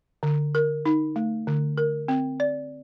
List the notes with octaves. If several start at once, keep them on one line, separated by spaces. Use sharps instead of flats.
D3
A#4
D#4
A3
D3
A#4
C4
D5